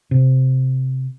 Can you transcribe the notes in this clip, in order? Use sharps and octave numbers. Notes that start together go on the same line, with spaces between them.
C3